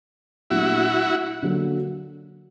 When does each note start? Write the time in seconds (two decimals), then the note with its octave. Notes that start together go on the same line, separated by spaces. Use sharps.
0.50 A#2 F#3 A3 D4 E4 F#4 G4
1.43 D3 F#3 A#3